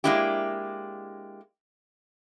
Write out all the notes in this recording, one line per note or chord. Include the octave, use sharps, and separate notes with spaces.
G#3 A#3 D4 E4 G4